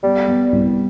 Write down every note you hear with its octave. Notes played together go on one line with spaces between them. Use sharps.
G3 B3
B3
C2